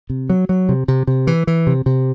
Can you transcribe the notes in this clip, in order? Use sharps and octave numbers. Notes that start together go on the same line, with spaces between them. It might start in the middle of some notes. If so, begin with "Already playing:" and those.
C3
F#3
F#3
C3
C3
C3
E3
E3
C3
C3